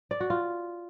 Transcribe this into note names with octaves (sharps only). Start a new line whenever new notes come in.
D5
F#4
F4